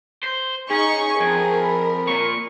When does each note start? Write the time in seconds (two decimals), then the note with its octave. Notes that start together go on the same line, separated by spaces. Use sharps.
0.23 C5
0.70 C#4 D#4 G#4 C#6
1.20 F2 A#4 G#5
1.63 B5
2.07 A#2 C#6